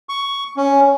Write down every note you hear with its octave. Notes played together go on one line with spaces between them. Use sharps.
C#6
C#4